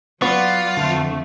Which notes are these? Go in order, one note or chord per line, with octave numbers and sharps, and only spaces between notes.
F#3 B3 F4 D5 F#5 C#6
F2 D3 A3